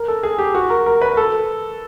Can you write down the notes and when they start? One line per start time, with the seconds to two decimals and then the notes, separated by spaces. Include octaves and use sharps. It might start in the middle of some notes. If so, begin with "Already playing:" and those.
Already playing: A#4
0.08 A4
0.23 G#4
0.38 G4
0.55 F#4
0.70 A#4
0.86 A#4
1.01 B4
1.17 A4